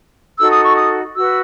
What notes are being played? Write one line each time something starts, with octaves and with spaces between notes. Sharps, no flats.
D#4 F#4 A4 E6
D#6
C#6
D#6
F#4 B4 E6